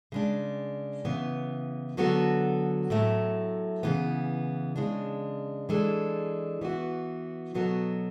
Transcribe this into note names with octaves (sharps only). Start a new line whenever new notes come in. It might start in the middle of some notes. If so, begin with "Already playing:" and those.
C#3 G#3 D4
C#3 E3 B3
D3 F#3 B3 F#4 A4
A2 F#3 A3
C#3 E3 B3
C#3 G#3 D4
E3 G#3 D4 A4
E3 B3 F#4
B2 F#3 B3 F#4 A4